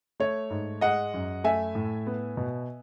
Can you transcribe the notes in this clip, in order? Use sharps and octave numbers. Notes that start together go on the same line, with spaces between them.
A3 C#5
G#2
G#3 D#5 F#5
F#2
A3 E5 G#5
A2
B3
B2